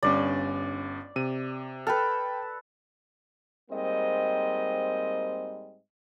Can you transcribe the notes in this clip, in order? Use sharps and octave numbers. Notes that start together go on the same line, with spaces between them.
G1 G2 C#4 D5
C3 D#7
A4 B4 G5 F6
G#2 G3 A#3 C4 D#5